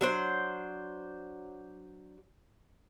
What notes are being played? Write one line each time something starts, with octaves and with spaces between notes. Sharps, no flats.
F#3 D4 C5